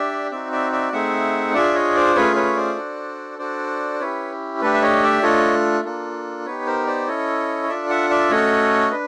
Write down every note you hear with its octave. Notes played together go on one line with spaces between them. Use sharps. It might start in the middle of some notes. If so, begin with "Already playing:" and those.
Already playing: D4 G4 D5 E5
C4 D#4 F#4 D5 E5
D5 E5
D5 E5
A3 C4 D#4 G#4 E5 F#5
D4 F4 G#4 D5 E5
C#5 D#5
C5 D5
A3 C#4 F4 G#4 B4 C#5
B4 C#5
C5 D5
D4 F#4 A4
D4 F#4 A4 C5 D5
C#4 E4 G4 B4 C#5
A3 D4 G4 A4 B4
E5
C#5 D#5
D5 E5
A3 D4 F4 A4 C#5 D#5
A#3 D4 F4 A4
B3 D#4 G4 B4 C#5
A#4 C5
C5 D5
C#4 E4 A4 C#5 D#5
D4 F4 A4 D5 E5
E5 F#5
D5 E5
A3 C#4 F#4 A4 C#5 D#5
D4 B4